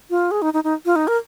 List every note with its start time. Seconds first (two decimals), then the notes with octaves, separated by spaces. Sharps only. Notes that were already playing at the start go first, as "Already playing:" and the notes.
0.10 F4
0.31 G#4
0.42 D#4
0.54 D#4
0.64 D#4
0.86 F4
0.96 D#4
1.08 A#4